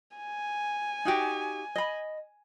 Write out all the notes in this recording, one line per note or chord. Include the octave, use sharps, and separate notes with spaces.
G#5
D#4 F#4 G4
D#5 B5